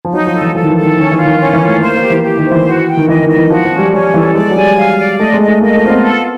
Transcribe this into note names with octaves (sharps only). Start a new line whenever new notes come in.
F3
F#3 D#4
F3
A4
E3
F3 A4
D#3
E3
A4
D#3
D#3 C#4
E3
F4
D#3
C#4
E3
F4
A3
A#3 C5
A#3
G4
E3
G4
D#3
C5
E3
F#4
G5
D#3
E3 D#5
D#3
D#5
E3
F3 F#4
F3
C#4
G3
G3 C#4
E3 A4
G#3 D5
F#3
G3 G#5
F5
D5
A3 D#5
G#3
D#5
A3
A#3 D#5
A3
C4 F4
B3
A4